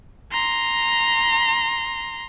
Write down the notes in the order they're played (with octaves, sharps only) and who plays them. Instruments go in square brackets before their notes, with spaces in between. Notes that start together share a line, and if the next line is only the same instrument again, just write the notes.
[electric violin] A#5 C6